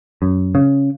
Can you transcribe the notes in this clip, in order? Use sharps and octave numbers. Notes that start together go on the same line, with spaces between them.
F#2
C#3